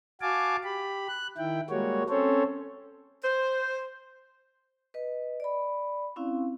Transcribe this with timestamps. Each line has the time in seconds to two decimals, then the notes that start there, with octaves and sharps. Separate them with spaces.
0.21 F#4 F5 G#5 A5 D6
0.64 G4 B5
1.08 F#6
1.38 D#3 E4 G5
1.70 G3 G#3 A#3 F#4 C#5
2.09 C4 C#4 A4 C5 C#5
3.22 C5
4.94 B4 D#5
5.40 D5 B5
6.16 C4 C#4 E4 F5